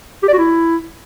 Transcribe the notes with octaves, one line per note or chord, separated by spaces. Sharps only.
G4
D5
F#4
E4